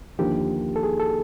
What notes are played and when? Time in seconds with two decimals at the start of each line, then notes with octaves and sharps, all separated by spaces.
0.19 D#2 D3 F3 A#3 D#4 G4
0.76 A4
0.83 G#4
1.00 A4